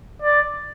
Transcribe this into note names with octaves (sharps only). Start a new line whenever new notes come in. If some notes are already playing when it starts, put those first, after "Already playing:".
D5